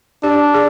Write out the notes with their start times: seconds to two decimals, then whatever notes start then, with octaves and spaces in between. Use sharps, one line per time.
0.23 D4 G4
0.54 G#4